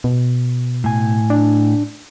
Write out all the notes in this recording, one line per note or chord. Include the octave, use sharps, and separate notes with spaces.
B2
A2 G#5
D4